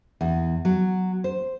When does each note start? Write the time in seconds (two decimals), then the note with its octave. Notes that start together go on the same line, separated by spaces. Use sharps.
0.21 E2
0.65 F#3
1.24 C5